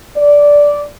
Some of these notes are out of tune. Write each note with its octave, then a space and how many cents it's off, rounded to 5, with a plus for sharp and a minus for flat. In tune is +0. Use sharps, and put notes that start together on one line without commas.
D5 -10